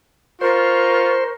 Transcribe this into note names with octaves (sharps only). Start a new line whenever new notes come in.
F4 A#4 C5 C#6